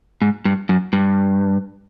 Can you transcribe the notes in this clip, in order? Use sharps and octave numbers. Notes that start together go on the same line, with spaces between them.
G#2
G2
F#2
G2